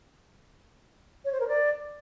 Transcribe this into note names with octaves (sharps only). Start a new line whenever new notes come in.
C#5
C5
A#4
D5